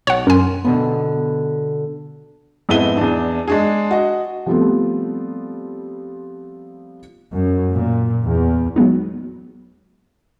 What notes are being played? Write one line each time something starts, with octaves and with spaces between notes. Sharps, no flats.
B1 C#5 F#5
F#2 A#4 G#5 C6
B2 D3 B3
F2 G#2 B3 E4 D#7 G7
E2 D4
G#3 D4 G#4
F#4 D#5
F3 G3 A3 B3 C4 F4
F#2
A#2
E2
F#3 G#3 B3 D#4